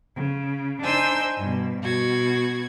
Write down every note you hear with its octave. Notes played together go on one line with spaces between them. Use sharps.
C#3
D4 D#4 C5 G#5 E6 G6
G2 B2
B2 F#4 G#6